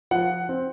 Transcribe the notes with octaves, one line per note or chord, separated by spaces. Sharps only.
F3 F#5
C4